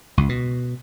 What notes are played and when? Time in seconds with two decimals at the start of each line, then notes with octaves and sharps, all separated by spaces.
0.17 C#2
0.29 B2